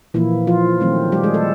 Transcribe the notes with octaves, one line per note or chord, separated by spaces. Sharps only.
A#2 E3 F3 A#3 E4
F3 F4
D#3 F#3 A3 C4
G3 G4
G#3 G#4
A3 A4